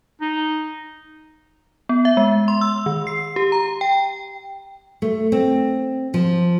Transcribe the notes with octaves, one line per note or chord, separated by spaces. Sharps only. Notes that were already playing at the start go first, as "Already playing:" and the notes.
D#4
B3
E5
G#3
C6
E6
D#3
C7
G4
A#5
G5
A3
C4
F3